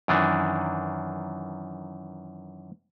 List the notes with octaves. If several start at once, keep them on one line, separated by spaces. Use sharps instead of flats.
F#2 D#3 E3 D4